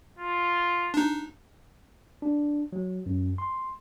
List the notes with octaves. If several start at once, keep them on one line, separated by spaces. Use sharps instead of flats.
F4
D4 D#4
D4
F#3
F#2
C6